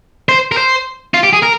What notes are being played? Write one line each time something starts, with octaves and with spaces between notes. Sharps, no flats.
C5
A#4
C5
F4
G4
G#4
A#4